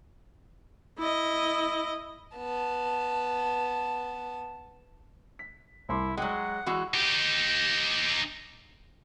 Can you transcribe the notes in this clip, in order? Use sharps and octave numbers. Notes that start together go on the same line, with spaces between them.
E4 D#5
B3 A5
B6
C2 E4 C6 D6
F#3 G#3 F#5 G5 D6
E3 G#3 F#4
D#4 G4